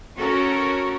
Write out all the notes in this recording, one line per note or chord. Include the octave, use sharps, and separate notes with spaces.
C#4 F#4 A4 A#4 C#5